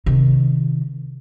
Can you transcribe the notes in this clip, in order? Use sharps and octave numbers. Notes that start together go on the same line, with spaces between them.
C3 D#3